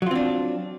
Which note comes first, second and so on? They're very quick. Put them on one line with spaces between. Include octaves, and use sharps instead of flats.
F#3 F4 C4 D4